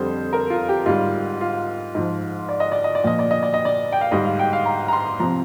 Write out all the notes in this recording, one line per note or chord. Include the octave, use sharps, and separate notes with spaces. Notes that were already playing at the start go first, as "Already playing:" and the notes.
Already playing: F2 D3 G3 C5
A#4
F4
G4
G#2 G3 F4
F4
G#2 F3
D5
D#5
D5
D#5
D5
A#2 F3 D#5
D5
D#5
D5
D#5
D5
G5
F5
G#2 G3 D#5
F5
G5
F5
A#5
A#5
C6
C3 F3 A#5